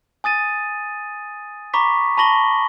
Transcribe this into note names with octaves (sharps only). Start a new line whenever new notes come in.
G#5 D#6 A6 D#7
A#5 B5 C#6 D6 B6
A5 B5 C#6 A#6 F#7 G7